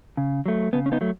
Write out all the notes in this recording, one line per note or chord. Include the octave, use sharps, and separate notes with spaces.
C#3
F#3 A3
C#3 B3
C#4
B3 D#4
F#3 A3